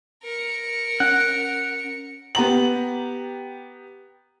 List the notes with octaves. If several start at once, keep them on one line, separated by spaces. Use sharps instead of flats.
A#4 C#7
C#4 F#5
B3 G4 A#5 F#7